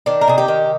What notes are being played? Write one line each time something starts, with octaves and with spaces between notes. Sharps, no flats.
D#3 D4
A#4
C3 G#4
G4
D#3